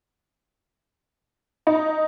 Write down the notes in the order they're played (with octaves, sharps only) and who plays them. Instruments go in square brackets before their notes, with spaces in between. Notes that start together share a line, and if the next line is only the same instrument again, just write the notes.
[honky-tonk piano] D#4